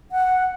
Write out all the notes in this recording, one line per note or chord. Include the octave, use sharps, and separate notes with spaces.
F#5